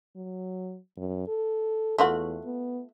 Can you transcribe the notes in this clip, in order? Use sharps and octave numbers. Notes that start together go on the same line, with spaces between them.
F#3
F#2
A4
E2 A3 F4 F#4
B3